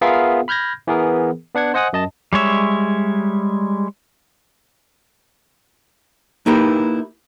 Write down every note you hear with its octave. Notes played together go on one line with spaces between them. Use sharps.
B3 F4 G#4 A#4 E5 F5
B5 F6 G6 G#6 A#6
E3 B3 G#4 A#4
B3 D4 F#5 G#6
C5 D#5 F#5 G#5 D#6 F#6
F#2 D#5 A5
G3 G#3 C#5 E5
A#3 D#4 E4 G4 A#4 B4